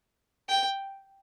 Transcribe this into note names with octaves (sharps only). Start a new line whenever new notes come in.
G5